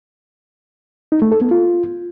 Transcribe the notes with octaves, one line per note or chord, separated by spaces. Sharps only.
D#4
A3
A4
B3
F4